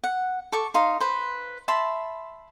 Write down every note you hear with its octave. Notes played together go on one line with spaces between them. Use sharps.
F#5
A4 C#6 D6
D#4 F5 C6
B4 C5
E5 A5 B5 C6